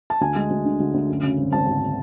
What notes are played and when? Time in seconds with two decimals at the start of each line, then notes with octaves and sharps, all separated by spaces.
0.10 A5
0.21 D2 G#5
0.36 G#3
0.50 D2
0.65 D3
0.80 D2
0.94 D2
1.09 F#2
1.23 C#3
1.38 G#1
1.52 G#1 A5
1.67 G#1